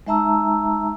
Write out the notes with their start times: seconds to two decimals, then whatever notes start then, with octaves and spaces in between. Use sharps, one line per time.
0.07 G#3 D#4 E5 A5 A#5 E6